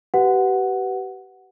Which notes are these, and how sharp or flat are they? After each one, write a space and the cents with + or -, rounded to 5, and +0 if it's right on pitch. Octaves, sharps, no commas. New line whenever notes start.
G4 -35 B4 +0 F#5 +0